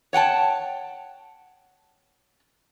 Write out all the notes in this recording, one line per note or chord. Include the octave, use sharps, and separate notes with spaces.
C#5 F#5 G5 A5